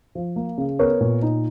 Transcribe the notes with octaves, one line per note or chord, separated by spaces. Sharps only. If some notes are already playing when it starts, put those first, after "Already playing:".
F3
A#3
C#3
B3 A#4 C#5
A#2
D#4